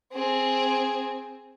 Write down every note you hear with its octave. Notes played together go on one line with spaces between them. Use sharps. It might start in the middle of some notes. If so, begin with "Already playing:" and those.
C4 G#4